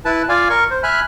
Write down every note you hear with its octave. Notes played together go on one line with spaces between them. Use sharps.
E4 B4 A5
F4 D5 F5 G#5
A#4 C#6
C5
E5 G#5 B5 F6 F#6